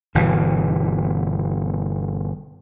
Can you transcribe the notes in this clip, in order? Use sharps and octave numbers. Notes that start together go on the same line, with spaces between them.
G1 B2 E3